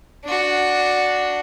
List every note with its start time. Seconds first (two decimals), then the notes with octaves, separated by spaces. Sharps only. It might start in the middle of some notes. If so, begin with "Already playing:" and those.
0.25 D4 F#4